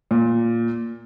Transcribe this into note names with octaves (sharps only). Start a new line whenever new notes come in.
A#2